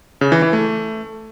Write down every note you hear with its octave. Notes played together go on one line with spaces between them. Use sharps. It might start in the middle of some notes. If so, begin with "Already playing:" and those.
C#3
E3
E3
A3